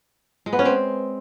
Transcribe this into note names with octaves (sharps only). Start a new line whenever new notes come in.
G#3
B3
C#4
C4